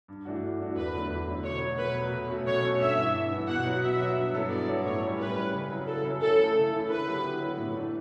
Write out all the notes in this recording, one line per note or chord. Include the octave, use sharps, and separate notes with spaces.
G2
E3 A3 D4 F#4
G2
E3 A3 D4 F#4
E2 B4
D3 F#3 A3 D4
E2
D3 F#3 A3 D4
B2 C#5
F#3 A3
B2 B4
F#3 A3
B2
A3 C#4 F#4 A4
B2 C#5
A3 C#4 F#4 A4
G2 E5
E3 B3
G2
E3 B3
B2 F#5
F#3 B3 F#4
B2 E5
F#3 B3 F#4
G2
F#3 B3 E4 A4
G2 D5
F#3 B3 E4 A4
A2 C#5
G3 C#4
A2 B4
G3 C#4
C#3
F#3 C#4 E4
C#3 A4
F#3 C#4 E4
C#3 A4
E3 A3 E4
C#3
E3 A3 E4
D3 B4
F#3 B3 E4 G4
D3
F#3 B3 E4 G4
A2
E3 A3 D4 A4